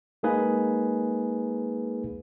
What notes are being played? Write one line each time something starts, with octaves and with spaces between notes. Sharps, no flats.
G#3 A#3 D#4 G#4 A#4 B4